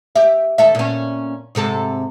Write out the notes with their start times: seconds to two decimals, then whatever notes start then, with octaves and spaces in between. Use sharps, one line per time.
0.16 G4 E5
0.58 D#2 A4 E5
0.75 A#2 C#4
1.55 G#2 C3 A4